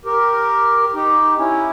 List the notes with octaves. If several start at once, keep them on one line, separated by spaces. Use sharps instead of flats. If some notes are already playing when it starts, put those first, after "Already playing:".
G4 A#4
D#4 G4
C#4 E4